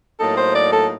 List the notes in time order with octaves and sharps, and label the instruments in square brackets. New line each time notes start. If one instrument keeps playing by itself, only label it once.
[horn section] A2 F#3 A#3 D#4 [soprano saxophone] A4
[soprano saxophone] C5
D5
A4